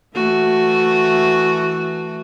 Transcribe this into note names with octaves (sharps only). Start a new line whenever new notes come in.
E3 A3 F#4